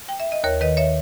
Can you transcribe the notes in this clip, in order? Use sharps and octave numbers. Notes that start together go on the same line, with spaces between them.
G5
E5
D#5
D#2 A#4 C#5
D#3 B4 D#5
C#5 E5